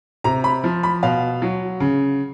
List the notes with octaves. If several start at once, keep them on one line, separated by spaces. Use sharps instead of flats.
C3 A#5
B5
F3
B5
B2 F5
F#3
C#3